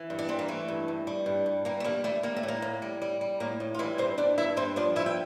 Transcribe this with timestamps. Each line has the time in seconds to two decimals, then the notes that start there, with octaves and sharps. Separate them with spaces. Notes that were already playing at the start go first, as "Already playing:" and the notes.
Already playing: E3
0.10 G2
0.19 D4
0.29 E3 C4
0.39 A#3
0.48 E3 A3
0.68 G2
0.88 G2
1.07 G3
1.26 G2
1.46 G2
1.65 G3 A#3
1.80 A3
1.84 G3 A#3
2.04 G3 A3
2.23 G3 A#3
2.36 A3
2.43 A2
2.48 A#3
2.62 A2
2.82 G3
3.02 G3
3.21 G3
3.40 A2 A#3
3.60 A2
3.74 F4
3.79 E3 G3 E4
3.98 G2 C4 C5
4.18 G2 D4 D5
4.38 G2 E4 E5
4.57 G2 C4 C5
4.76 F3 D4 D5
4.96 G2 E4 E5
5.06 G5